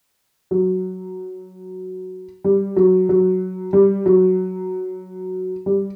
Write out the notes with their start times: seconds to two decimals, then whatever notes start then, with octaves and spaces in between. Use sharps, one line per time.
0.51 F#3
2.44 G3
2.76 F#3
3.09 F#3
3.73 G3
4.06 F#3
5.66 G3